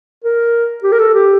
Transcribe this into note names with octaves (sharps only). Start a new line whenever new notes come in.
A#4
G4
A#4
A4
G4